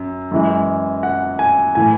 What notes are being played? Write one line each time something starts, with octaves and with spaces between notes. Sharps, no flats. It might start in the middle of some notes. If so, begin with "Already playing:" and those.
Already playing: F#2
F#2 E3 G#3
F#5
G#5
A2 E3 G#5